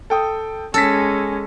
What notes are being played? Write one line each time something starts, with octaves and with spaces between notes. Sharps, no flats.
A4 G5 D#6
G#3 C#4 A4 E6 A#6 B6